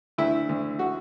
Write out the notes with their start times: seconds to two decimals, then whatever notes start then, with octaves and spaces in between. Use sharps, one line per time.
0.18 D2 E4
0.49 D2
0.79 F#4